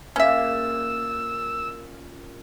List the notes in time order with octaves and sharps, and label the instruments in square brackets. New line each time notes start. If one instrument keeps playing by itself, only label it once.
[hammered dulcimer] A#2 C#3 D5 [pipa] C#4 E5 [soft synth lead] E6